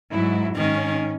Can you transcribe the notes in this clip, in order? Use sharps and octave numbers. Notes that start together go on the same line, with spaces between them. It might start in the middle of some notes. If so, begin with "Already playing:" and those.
G#2 F#3 E4
G#2 D#3 C#4